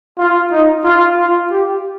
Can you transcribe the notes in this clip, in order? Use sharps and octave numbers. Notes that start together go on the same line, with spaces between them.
F4
D#4
F4
F4
G4